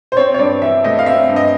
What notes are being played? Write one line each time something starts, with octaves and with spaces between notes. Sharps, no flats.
C5
C4 C#5
C#5
G2 D5
E3 E5
A3 D#5
F5
C4 E5
G2
D#5